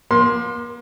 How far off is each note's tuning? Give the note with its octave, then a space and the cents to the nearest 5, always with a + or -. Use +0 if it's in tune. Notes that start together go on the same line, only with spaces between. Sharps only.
A#3 +40 C6 +0